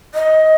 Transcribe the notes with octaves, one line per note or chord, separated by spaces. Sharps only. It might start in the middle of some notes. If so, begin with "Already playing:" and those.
D#5